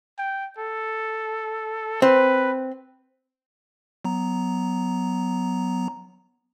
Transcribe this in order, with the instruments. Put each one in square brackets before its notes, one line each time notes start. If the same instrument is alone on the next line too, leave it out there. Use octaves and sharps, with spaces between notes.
[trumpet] G5
A4
[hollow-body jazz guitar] C4 [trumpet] B4
[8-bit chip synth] F#3 B3 A#5